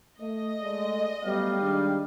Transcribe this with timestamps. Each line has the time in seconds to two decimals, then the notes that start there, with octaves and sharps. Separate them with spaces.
0.21 A3 D#5
0.61 G#3 A3 D5
1.24 F#3 G3 A3 B3 F5
1.60 D#3 G#3 D4